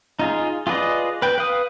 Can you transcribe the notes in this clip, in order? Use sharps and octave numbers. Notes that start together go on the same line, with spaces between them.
D#4 F4 G#4
F4 G#4 B4 D5 D#5
B4 G5
B4 F5 D#6